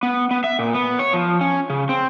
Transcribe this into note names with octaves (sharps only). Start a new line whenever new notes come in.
B3
B3
E5
A#2
B3
C#5
F3
C#4
C#3
C4